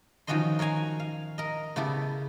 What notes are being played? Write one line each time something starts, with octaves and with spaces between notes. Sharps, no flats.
D#3 F3 F#3 C#4 D#5 C6
A#4 C#5 F5 G#5 A#5
F5
A#4 D#5
C#3 B3 E4 G4 A4